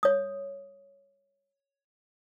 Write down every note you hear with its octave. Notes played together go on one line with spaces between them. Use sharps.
C#5 D#6